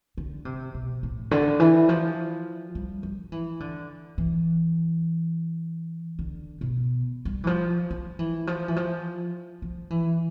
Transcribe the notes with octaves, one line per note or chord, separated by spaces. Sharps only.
D3
C3
B2
A2
D3
E3
F3
G3
F3
E3
D3
E3
D3
B2
G3
E3
F3
F3
E3
F3
E3
F3
F3
E3